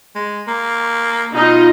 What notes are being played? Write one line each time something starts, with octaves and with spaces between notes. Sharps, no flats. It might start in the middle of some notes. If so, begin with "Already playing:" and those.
G#3
A#3
B2 D#4 F4 D#5